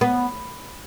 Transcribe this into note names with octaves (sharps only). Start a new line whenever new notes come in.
B3